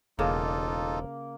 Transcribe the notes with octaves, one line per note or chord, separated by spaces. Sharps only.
E1 C#3 A#3 D#4 F4 A4